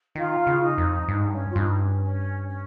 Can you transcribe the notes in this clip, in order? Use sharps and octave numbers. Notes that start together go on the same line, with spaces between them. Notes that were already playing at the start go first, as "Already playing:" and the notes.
D#3 F4
C#3
D#4
F2
G2 D#4
G#2
G2 C#4
F4
G2 D#4
C#4
C#4
C#4